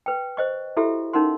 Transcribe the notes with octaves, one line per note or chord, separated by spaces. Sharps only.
B4 G5
C5 D#5 C#6
E4 F#4 G4 A4 E5
C#4 D#4 A#4 F#5 C6